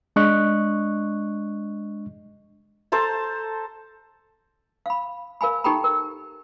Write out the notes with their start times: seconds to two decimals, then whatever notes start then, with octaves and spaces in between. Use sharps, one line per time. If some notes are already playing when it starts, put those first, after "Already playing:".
0.16 G#3 D4 D#5 C#6 F#6
2.92 A4 C5 A5 A#5
4.86 F5 B5
5.41 A#4 F5 G#5 B5
5.64 D#4 G4 A4 G5 A#5 B5
5.84 A#4